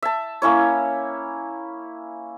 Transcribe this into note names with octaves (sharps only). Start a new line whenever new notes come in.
E5 A5
A#3 C#4 E4 C#5